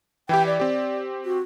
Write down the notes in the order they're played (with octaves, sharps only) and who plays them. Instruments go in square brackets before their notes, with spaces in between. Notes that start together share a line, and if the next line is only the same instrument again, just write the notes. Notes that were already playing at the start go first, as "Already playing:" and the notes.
[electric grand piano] E3 E4 G4 [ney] G5
[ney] D5
[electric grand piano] C4 G4
[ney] F#4